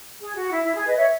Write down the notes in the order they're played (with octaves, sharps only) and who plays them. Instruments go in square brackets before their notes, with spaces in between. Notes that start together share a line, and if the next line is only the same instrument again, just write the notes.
[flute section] G#4
F#4
E4
E4
G#4
B4 D#5
C#5 E5